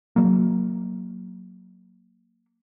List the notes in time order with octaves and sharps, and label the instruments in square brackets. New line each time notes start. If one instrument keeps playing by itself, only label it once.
[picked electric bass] F#3 A#3